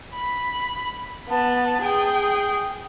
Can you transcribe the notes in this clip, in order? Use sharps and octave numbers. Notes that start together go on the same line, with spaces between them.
B5
B3 A5
G#4 G5